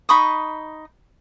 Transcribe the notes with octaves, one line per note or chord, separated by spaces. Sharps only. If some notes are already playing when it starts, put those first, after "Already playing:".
D#4 B5 C#6 D#6